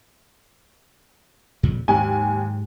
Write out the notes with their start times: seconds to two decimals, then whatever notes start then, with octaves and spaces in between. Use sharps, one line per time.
1.63 F2 A#2 C#3
1.88 D#2 G#2 F#3 G#5